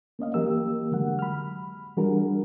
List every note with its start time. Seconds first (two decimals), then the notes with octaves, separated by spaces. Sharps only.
0.19 A#3 C#4 D#5 F5
0.34 E3 F#3 A#3 G4 A#4 E6
0.92 D3 F#3 G#3 F#5
1.19 B5 F6
1.97 E3 G3 D4 F#4 G#4 A#4